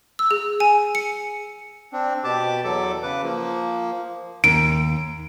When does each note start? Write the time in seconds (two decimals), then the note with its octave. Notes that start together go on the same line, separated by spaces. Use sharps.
0.19 E6
0.31 G#4
0.60 G#5
0.95 C#7
1.93 C4 D4
2.24 B2 G4 A5 D6
2.64 E2 F#3 A4 D6
3.03 C#3 B4 D6
3.23 F3 A#3
4.44 D#2 D7